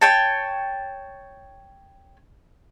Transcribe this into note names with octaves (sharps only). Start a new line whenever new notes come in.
C#5 G5 A5